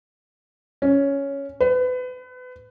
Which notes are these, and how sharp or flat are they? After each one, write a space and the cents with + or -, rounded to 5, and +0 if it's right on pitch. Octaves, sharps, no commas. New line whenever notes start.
C#4 +5
B4 +30